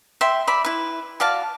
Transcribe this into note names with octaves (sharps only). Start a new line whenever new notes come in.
E5 G5 C6
D5 E5 B5
E4 B4
F#4 D5 F5 A5